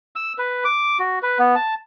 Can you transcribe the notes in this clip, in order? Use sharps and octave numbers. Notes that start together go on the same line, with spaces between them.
E6
B4
D6
F#4
B4
B3
A5